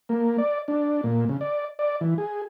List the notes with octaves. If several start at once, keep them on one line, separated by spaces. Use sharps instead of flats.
A#3
D5
D4
A#2
C#3
D5
D5
E3
G#4